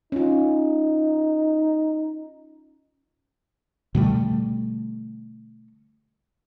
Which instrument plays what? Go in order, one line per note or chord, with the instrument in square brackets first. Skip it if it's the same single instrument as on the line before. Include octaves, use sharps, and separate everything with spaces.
[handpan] C#4 F4 [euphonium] D#4
[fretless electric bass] B2 D3 G3 A3